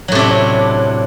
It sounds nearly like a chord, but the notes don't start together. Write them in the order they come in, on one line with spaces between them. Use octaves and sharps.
F#3 A2 C3 D4